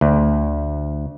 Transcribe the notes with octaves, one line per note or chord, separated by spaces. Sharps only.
D2